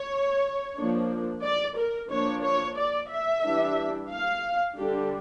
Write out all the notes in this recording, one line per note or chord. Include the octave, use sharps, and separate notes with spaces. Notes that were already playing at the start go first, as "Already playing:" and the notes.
Already playing: C#5
F3 A#3 D4
D5
A#4
F3 A#3 D4 C#5
C#5
D5
E5
E3 G3 D4
F5
D3 G3 D4 G4